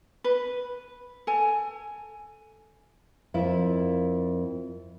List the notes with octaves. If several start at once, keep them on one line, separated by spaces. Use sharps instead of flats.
B4
A4 G#5
F2 E4 F4 A#4